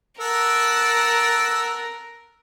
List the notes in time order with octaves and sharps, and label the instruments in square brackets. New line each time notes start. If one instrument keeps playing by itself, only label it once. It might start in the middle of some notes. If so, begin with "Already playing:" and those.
[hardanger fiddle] A#4 [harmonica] F#5 A5 E6